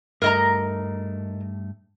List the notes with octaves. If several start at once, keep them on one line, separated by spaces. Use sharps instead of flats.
G2 A3 A#4 D#5 A#5